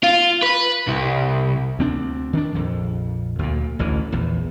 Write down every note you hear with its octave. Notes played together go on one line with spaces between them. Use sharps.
F4
B4
C2
D2 C4 D4
D#3 D4
A#1 F2
D2 A#2
A1 D2 D3 E3
A#1 E2